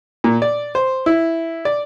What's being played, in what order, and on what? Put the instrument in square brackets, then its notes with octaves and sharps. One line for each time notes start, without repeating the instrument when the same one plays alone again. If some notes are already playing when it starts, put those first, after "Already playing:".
[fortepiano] A#2
D5
C5
E4
D5